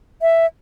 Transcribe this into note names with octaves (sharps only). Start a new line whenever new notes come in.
E5